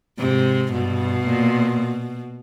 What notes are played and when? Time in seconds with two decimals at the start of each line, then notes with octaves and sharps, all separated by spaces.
0.18 G#2 C3
0.73 G2 B2
1.26 A#2